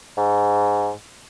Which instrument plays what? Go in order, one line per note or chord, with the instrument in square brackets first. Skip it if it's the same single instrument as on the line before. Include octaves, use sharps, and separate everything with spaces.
[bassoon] G#2